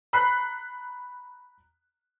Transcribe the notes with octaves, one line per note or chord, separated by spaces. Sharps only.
A#5 B5 F#6 B6 C7